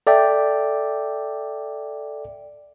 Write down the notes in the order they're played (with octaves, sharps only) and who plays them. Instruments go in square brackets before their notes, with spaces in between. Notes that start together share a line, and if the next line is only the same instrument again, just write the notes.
[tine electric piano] A4 D5 E5 G5